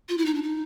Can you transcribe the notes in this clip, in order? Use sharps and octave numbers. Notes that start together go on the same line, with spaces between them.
F4
E4
D#4
D4
D#4